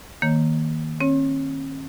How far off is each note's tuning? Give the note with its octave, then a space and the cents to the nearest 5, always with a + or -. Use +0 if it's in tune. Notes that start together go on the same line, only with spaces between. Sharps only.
D#3 +10 A#3 +0 C#5 +0
C#4 -45 C#5 +0